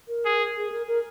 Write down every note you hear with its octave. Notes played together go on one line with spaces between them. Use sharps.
A#4
G#4
G#4
A#4
A#4